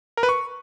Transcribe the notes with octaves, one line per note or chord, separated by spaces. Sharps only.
A#4
B4
C#6